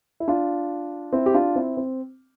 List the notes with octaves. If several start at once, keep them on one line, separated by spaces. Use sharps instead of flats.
E4
D4 F4
C4 E4
G4
D4 F4
C4 E4
C4